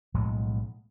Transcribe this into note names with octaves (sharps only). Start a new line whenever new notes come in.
B1 A2 F3 G#3